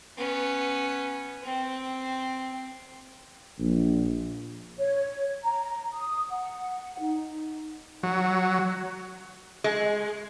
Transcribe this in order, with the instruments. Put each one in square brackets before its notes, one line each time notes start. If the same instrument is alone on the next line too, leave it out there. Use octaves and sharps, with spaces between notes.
[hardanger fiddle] B3 C#4
C4
[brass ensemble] A#1
[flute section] C#5
A#5
D#6
F#5
D#4
[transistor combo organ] F#3
[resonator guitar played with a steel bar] G#3